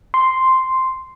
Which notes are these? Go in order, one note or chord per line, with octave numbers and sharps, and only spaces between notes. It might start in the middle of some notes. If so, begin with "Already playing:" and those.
C6